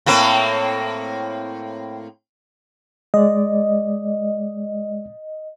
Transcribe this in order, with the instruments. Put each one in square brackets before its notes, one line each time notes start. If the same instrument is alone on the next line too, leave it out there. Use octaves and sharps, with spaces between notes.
[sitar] A2 A#3 C4
[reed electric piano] G#3 D5 [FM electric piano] D#5